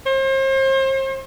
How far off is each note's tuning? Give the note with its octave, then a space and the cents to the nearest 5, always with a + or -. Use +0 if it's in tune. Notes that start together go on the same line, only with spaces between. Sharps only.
C5 +40